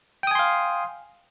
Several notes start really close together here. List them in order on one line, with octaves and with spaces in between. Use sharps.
G5 D#6 G#5 C6 F5